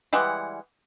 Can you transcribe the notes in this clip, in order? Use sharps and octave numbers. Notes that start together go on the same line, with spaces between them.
E3 G3 G#3 F#5